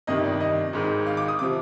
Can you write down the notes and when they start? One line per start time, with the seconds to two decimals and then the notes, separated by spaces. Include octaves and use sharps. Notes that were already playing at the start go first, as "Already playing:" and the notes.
0.07 G1 F2 C3 D#3 D#5
0.24 D5
0.40 D#5
0.73 G#1 G#2 D#3
1.06 F5
1.17 D6
1.28 D#6
1.39 C3 F3 D6